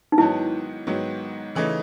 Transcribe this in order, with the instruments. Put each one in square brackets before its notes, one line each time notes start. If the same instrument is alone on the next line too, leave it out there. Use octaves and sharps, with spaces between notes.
[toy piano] D#4
[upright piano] G#2 D#3 F#3 B3 [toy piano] E4
[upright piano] G#2 D#3 F#3 B3
C#3 E3 A3 D#4